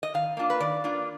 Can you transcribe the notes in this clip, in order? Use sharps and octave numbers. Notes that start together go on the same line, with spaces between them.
D#5
D#3 F5
A#3 D4 F4
B4
D#3 D5
A#3 D4 F4